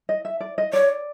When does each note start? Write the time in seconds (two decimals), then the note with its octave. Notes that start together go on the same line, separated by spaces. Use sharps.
0.09 D#5
0.25 E5
0.40 D5
0.58 D#5
0.73 C#5 D5